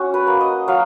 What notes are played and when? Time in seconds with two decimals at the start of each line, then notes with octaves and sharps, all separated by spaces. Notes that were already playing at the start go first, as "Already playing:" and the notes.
Already playing: C#4 F#4
0.14 B4
0.27 A#3
0.41 D#5
0.68 F#3 F5